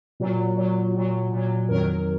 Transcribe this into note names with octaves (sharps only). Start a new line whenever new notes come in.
A#2 F#3
A#2 F#3
A#2 F#3
A#2 F#3
F2 D#3 F#3 A#4